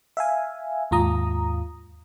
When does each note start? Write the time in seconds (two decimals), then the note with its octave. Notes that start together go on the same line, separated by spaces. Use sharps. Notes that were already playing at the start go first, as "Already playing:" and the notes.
0.17 E5 F5 G#5
0.91 D#2 G#2 F4 A#5 D#6